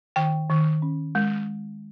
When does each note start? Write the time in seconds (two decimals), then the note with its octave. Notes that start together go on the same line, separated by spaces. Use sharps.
0.16 D#3 G5
0.50 D#3
0.82 C#4
1.15 G#3